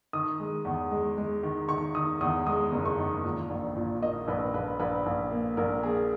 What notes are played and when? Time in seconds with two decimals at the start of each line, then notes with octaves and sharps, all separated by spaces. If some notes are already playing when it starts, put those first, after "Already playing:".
0.13 D#3 D#6
0.40 G#3
0.65 E2
0.91 G#3
1.17 G#3
1.43 D#3
1.69 D#3 C#6
1.95 D#3 D#6
2.21 E2 D#6
2.47 G#3 D#6
2.72 F#1
2.85 C#6
2.98 D#3
3.24 A#2
3.50 A#1
3.76 A#2
4.02 A#3 D#5
4.28 A#1 B4
4.54 A#1 B4
4.80 A#1 B4
5.06 A#1
5.31 A#3
5.57 A#1 A#4
5.83 A#3 G#4